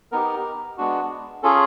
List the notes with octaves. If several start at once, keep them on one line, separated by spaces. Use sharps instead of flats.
B3 D#4 G4 A#4
G#3 B3 D4 F#4
C#4 F4 G#4 A4